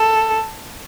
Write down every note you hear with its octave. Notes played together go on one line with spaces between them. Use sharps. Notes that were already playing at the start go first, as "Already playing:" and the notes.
Already playing: A4